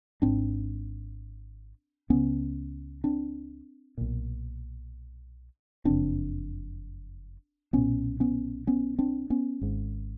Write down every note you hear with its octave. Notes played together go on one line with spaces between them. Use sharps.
G#1 G#2 C4 D4
C#2 C#3 B3 C#4
C4 D4
B1 A#2
F#1 F2 C#3 C4 D4
B1 A#2 B3 C#4
B3 C#4
B3 C#4
C4 D4
B3 C#4
G#1 G#2